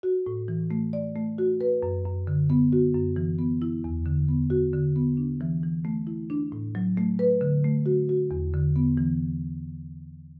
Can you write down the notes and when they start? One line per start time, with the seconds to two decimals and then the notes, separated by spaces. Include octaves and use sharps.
0.03 F#4
0.27 A2
0.48 E3
0.71 A3
0.93 D5
1.16 A3
1.38 F#4
1.61 B4
1.83 F#2
2.05 F#2
2.27 D3
2.50 B3
2.73 F#4
2.94 F#2
3.16 E3
3.39 B3
3.62 E4
3.84 E2
4.06 D3
4.28 B3
4.50 F#4
4.73 D3
4.96 B3
5.17 D4
5.41 E3
5.63 E3
5.85 A3
6.07 E4
6.30 D4
6.52 A2
6.75 F#3
6.97 A3
7.19 B4
7.41 D3
7.64 A3
7.86 F#4
8.09 F#4
8.31 E2
8.53 D3
8.76 B3
8.97 E3